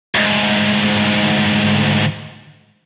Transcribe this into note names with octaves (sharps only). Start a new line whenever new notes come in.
D2 G#2